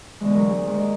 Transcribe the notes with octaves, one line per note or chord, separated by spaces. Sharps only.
B2 D3 E3 G#3
D2 F#3 A#4
G#4
D#2 G#2
A#4 D#5